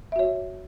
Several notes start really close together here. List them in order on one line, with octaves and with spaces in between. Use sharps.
E5 F#4 C#5